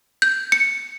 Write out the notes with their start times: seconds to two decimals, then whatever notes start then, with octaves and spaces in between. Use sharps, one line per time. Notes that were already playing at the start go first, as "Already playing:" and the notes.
0.22 G6
0.52 C#7